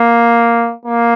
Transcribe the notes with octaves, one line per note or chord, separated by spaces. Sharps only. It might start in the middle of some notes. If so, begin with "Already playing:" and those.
Already playing: A#3
A#3